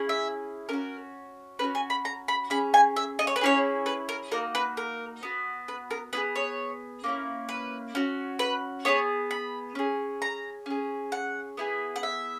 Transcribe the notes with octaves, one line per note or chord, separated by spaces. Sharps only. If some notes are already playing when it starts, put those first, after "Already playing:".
Already playing: C#4 E4 G#4
E5
C#4 F#4 A#4
C#4 F#4 B4
G#5
B5
A#5
B5
C#4 G#4 B5
G#5
E5
D#5
C#5
B4
C#4 E4 G#4 C#5
B4
A#4
A#3 D#4 F#4 A#4
B4
A#4
B3 F#4
B4
A#4
B3 E4 G#4 B4
C#5
A#3 C#4 E4
B4
C#4 F#4
B4
B3 E4 G#4 C#5
B5
C#4 G#4
A#5
C#4 G#4
F#5
B3 E4 G#4
F#5
E5